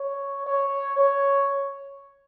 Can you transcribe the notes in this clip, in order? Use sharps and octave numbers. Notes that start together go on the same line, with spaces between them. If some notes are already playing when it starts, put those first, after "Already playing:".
Already playing: C#5
C#5
C#5